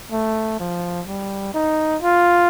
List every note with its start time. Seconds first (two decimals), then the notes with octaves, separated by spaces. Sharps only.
0.12 A3
0.59 F3
1.08 G3
1.54 D#4
2.02 F4